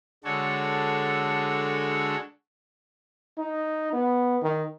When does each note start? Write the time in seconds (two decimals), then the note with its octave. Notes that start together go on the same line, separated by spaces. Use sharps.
0.24 D3 G#3 D4 F#4 A4 C#5
3.38 D#4
3.93 B3
4.42 D#3